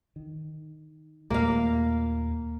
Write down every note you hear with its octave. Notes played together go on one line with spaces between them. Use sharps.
D#3
D#2 A#2 A3 A#3 F5